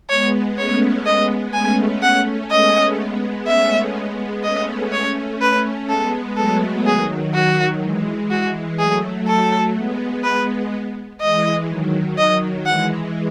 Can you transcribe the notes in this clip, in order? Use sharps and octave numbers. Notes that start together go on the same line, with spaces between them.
G#3 B3 C#5
A3 C#4 C#5
G#3 B3 D#5
A3 C#4 G#5
F#5
G#3 B3 D#5
G#3 B3
A3 C#4 E5
G#3 B3
A3 C#4 D#5
C#5
B4
G#3 B3 A4
F#3 A3 A4
D#3 F#3 G#4
D#3 F#3 F#4
E3 G#3
E3 G#3 F#4
F#3 A3 G#4
A4
G#3 B3
G#3 B3 B4
E3 G#3 D#5
D#3 F#3
D#3 F#3 D#5
E3 G#3 F#5